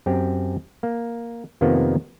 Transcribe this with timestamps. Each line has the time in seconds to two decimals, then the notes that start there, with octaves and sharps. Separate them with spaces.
0.06 F#2 C4 G4
0.83 A#3
1.61 F2 C3 D#3 F3 A#3 B3